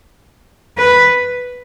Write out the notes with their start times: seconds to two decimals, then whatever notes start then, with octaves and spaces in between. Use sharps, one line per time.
0.78 B4